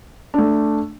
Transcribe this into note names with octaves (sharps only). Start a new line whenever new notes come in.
A3 D4